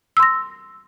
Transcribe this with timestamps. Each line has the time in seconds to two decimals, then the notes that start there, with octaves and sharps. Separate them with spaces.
0.17 E6
0.20 C6
0.23 A#6